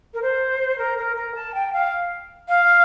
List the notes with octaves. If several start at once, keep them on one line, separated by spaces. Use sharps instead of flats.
A#4
C5
A#4
A#4
A#4
A5
G5
F5
F5